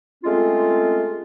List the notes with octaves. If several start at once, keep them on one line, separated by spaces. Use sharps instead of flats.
G#3 A3 C4 C#4 F4